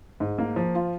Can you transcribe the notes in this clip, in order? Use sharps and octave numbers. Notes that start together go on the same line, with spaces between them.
G#2
A#3
F3
F4